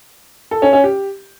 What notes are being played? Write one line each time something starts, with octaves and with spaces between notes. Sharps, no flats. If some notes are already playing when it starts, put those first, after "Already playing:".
A4
C#4
C#4
G4